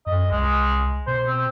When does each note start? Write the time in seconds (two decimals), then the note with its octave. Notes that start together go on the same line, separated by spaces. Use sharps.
0.06 F#2 D#5
0.31 C2 G#3
1.07 B2 C5
1.27 C4